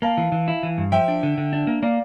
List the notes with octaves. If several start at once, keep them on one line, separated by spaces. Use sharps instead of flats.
A#3 F5 A5
E3
E3
E4
E3
G2
F3 E5 G5
D4
D3
D3
D4
A#3
A#3 D5 F5